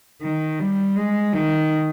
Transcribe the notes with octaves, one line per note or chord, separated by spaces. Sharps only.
D#3
G3
G#3
D#3